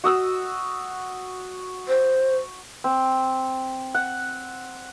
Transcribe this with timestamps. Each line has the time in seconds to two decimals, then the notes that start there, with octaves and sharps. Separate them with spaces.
0.04 F#4 D#6 E6
1.88 C5
2.84 C4
3.95 F#5